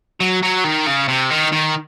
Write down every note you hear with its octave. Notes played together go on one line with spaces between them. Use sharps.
F#3
F#3
D#3
C#3
C3
D#3
D#3